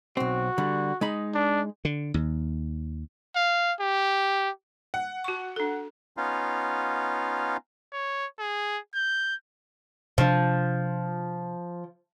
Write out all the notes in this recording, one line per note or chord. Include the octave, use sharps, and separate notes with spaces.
B1 C4 F#4
D3 G3
G#3 D#4 B5
D4
D3
D#2
F5
G4
F#5
F#4 C#6
D4 A4
B3 C#4 D#4 F4 F5
C#5
G#4
G6
C3 F3 D4